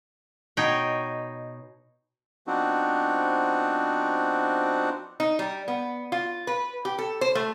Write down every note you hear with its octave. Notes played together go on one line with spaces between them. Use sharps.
B2 D#4 C#5 G5
F3 B3 C4 D4 D#4 F#4
D#4
G3
B3
F4
B4
G4
A4
C5
A3